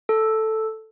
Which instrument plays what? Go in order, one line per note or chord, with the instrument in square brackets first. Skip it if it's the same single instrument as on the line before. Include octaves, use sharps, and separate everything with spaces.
[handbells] A4